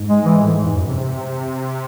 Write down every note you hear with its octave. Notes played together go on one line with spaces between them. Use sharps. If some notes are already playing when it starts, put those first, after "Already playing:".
Already playing: G#2
G#3
E3
A2
G#2
E2
F#2
C3